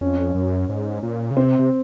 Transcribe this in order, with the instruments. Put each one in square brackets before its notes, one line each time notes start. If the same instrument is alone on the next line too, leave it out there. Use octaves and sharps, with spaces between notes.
[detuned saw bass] F2 [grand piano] C#4
[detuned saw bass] F#2
G#2
A#2
C#3
[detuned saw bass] C3 [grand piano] C4
[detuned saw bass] C3